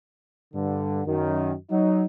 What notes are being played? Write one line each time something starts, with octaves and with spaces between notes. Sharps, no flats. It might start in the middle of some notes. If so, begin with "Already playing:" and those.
G2 D3
F#2 D#3
F#3 D#4